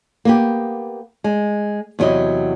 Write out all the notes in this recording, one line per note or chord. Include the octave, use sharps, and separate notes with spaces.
A#3 B3 G4
G#3
E2 C3 F#3 E4 D#5